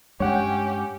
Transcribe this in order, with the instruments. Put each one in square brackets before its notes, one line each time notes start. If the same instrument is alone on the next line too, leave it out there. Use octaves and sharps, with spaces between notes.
[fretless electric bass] G2 G#3 D4 [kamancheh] C#4 G4 [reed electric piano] C#5 F#5 G5